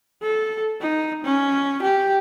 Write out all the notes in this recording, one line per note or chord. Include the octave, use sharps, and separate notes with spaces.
A4
D#4
C#4
G4